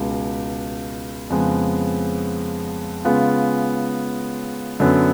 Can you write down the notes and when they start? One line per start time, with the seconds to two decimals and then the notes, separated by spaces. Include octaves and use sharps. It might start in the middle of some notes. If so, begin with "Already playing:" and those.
Already playing: C#2 B2 G#3
1.30 F2 C#3 G#3 B3
3.05 C#3 G#3 B3 F4
4.80 F#2 D3 F#3 B3